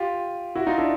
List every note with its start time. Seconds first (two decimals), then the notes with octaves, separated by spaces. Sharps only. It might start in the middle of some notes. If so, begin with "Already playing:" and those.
Already playing: F4 G4
0.55 E4 F#4
0.67 D#4 F4
0.78 D4 E4